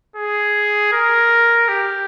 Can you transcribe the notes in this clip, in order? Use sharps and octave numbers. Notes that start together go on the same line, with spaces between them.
G#4
A#4
G4